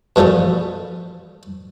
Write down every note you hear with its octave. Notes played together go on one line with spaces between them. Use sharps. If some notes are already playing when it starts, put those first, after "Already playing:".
B2 E3 F3 G3 A3